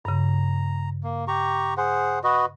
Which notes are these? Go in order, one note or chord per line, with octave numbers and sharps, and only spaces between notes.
G2 C#3 A#5
A#3
G4 A#5 C#6
G#4 C5 F#5
F#4 B4 D#5